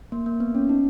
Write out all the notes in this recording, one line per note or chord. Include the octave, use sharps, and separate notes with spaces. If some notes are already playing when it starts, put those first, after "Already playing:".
A#3
A#3
B3
C#4
D#4